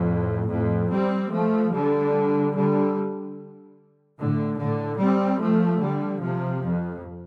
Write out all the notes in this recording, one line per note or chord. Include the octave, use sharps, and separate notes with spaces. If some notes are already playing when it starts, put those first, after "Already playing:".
Already playing: F2 A2
F2 A2
G3 C4
F3 A3
D3 G3
D3 G3
A2 D3
A2 D3
G3 C4
F3 A3
D3 G3
C3 F3
F2